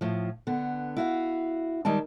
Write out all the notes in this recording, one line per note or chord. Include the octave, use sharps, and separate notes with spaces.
A2 F3
D3 B3
E4 F#4 F5
D#3 G3 G#3 A5